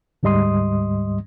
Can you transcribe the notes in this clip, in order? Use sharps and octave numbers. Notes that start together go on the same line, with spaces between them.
D2 G#2 G3 D#5 C6 D#6